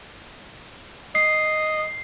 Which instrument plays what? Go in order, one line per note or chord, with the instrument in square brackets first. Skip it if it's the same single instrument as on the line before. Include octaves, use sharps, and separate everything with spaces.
[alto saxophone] D#5 [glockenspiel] C7